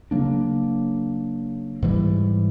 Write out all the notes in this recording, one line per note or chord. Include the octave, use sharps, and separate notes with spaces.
C#3 F#3 A#3 D4
G#2 E3 G3